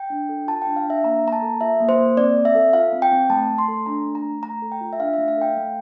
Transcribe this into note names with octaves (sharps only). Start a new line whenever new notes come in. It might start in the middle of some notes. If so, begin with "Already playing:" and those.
Already playing: G5
D4
A4
F4 A5
D4 G5
F5
D4 E5
A#3 A#5
A#3 A#5
A5
A4
F4 E5
A#3
C5
A#3
C4 D5
C4
E5
A4
F4 F5
C4
G5
C4
A3 A5
A3
C6
A4
D4 A#5
A3
A#5
A3
A3 A#5
A4
G5
F4
E5
D4 F5
A3 E5
F5
A4 G5
A3